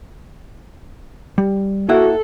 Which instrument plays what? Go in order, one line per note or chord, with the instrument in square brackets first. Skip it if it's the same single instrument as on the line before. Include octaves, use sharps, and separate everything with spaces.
[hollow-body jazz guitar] G3
[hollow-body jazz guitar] A#3 E4 F#5 [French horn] F#4 [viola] A4